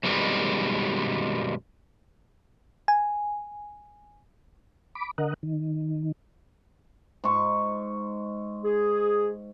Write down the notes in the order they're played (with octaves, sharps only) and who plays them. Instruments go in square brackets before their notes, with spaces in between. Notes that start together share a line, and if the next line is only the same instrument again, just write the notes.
[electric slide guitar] F#2 B2 D#3 G3 G#3 C4
[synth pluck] G#5
[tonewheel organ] B5 D6
D3 A#4 D#5 F#5
D#3
[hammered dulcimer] G#2 C#6
[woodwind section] G#4